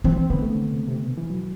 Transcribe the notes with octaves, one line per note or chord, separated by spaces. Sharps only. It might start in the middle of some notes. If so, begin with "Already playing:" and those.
E3 C4
C4
D3 B3
A3
D3
C3
C3
B2
E3
F#3